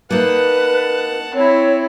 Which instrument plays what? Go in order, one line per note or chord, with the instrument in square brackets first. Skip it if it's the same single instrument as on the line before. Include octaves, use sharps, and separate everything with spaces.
[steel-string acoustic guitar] A#3 D#4 [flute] B4 [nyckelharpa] F#5 A5
[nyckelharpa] C4 E4 [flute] C#5